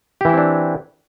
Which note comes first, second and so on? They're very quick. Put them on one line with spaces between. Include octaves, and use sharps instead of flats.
G4 E3 E4 C4 D4